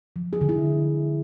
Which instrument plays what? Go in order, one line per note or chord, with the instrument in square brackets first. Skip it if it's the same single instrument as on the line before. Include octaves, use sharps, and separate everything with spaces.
[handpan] F3
G#4
D3
E4